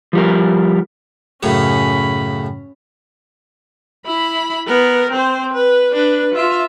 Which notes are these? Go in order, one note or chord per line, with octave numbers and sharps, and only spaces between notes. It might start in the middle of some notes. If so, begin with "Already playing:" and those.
F3 G3 A#4
F#2 A2 C#3 C#4 B5
E4 B5
B3 A#4
C4 C5
B4
D4 B4
F4 E5